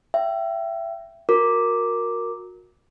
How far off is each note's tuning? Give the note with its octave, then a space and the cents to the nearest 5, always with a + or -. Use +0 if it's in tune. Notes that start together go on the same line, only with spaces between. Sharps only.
E5 +25 G5 -20
F#4 -30 A#4 -5 D6 +0